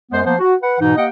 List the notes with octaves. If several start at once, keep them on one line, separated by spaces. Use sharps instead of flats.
F#2 G#3 B3 C5
F3 A#3 B3 C5
F#4
B4 F#5
G#2 B2 E3 D#4
A#3 G4 D#5 F#5 G5